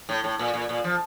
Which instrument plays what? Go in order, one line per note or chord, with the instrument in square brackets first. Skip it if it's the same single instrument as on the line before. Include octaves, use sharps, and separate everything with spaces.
[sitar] A2
A2
A#2
A#2
A#2
F3